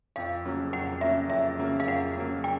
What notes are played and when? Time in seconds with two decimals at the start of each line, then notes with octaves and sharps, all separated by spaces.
0.16 F2 F5
0.45 C#3 F#3 A#3
0.73 F2 F#5
1.01 C#3 F#3 A#3 E5
1.30 F2 E5
1.59 C#3 F#3 A#3
1.80 F5
1.88 F2 F#5
2.16 C#3 F#3 A#3
2.44 G5